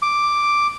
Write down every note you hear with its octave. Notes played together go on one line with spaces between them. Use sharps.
D6